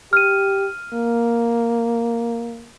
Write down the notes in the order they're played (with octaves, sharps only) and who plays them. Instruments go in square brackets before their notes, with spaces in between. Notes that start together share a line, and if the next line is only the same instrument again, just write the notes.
[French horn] G4 [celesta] F6 D#7
[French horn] A#3